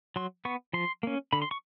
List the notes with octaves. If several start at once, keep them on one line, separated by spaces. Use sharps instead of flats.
F#3 C6
B3 C#6
F3 C6
A#3 C#4
D3 B5
C6
C#6